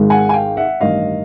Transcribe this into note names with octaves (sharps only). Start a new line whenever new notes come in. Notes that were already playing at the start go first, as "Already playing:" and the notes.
Already playing: G#1 G#2 D#3 G#3
F#5 G#5
G#5
F5 G5
E5 F#5
A1 G2 D#3 D#5 F5